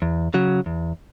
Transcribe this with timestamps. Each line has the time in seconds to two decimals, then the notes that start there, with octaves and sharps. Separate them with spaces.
0.02 E2
0.34 C#3 F#3
0.66 E2